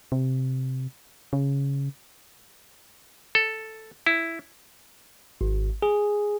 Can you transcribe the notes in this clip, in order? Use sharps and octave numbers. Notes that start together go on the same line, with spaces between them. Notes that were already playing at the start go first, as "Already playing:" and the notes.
C3
C#3
A4
E4
G#1
G#4